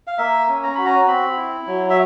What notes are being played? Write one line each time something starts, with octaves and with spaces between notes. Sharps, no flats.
F5
A#3 E5
C#4
A#5
F#4 B5
A#5
C4 B5
E4
F#3
E5